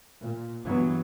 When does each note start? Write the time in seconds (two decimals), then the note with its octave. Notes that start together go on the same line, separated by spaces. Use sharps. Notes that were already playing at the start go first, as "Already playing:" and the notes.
0.20 A#2
0.66 G2 E3 F#3 B3